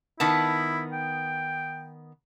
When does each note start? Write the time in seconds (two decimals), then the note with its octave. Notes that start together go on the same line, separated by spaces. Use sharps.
0.20 D#3 B3 E4 A5
0.92 G5